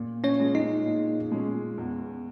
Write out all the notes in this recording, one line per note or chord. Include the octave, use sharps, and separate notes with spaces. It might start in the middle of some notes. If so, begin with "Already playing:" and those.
Already playing: A#2
C#4 C#5
G#3 C#4
D#4 D#5
A#2
G#3 C#4
E2